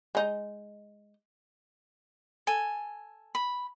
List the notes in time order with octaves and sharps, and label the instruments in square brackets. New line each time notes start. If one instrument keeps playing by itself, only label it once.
[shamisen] G#3 D#4
[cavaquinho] A4 G#5
B5